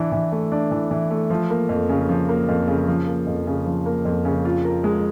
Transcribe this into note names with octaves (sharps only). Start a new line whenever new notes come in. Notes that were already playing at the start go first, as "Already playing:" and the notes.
Already playing: E3 D4
E3
A3
D4
E3
E3
A3
F3
A#3
F2
C#3
F3
A#3
F2
C#3
F3
A#3
F2
C#3
F3
A#3
F2
C#3
F4
A#4
G#3